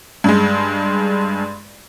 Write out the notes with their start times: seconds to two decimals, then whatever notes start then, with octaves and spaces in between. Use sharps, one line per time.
0.24 G2 G#3